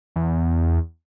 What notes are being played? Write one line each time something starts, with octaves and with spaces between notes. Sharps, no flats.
E2